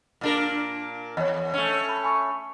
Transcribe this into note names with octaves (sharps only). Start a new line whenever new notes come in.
A#2 D4 A#4
E2 C#5 D#5
A3 C#4
B5
G#5 B5 C#6